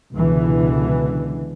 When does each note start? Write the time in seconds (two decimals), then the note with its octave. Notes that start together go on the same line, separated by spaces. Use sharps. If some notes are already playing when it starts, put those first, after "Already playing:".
0.14 C#2 B2 D3 E3